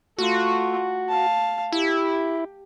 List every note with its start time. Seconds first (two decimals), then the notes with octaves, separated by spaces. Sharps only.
0.18 A3 F4 F#4
1.09 F5 A5
1.72 E4 G4